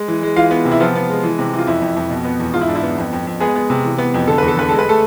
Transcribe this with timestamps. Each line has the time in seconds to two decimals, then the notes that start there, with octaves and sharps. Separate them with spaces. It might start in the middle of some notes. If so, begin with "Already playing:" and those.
Already playing: G#3
0.08 E3
0.23 G#3
0.36 E3 F4 F5
0.51 B3
0.65 C3
0.71 E4
0.80 F3 B3 F4
0.95 B3
1.10 G#3
1.24 E3
1.39 C3
1.53 E3
1.58 F4
1.67 F2 E4
1.82 F2
1.96 F2
2.10 B2
2.25 B3
2.40 E2
2.54 G#2 F4
2.61 E4
2.68 G#2 D4
2.75 E4
2.83 B3
2.98 F2
3.13 F2
3.27 F2
3.40 G#3 B3 G#4
3.55 B3
3.70 C3
3.85 E3
3.98 B3
4.14 F2
4.27 D3 A4
4.38 E2 B4
4.48 A4
4.57 D3 B4
4.69 G#3 A4
4.79 B4
4.86 G#3 A3 A4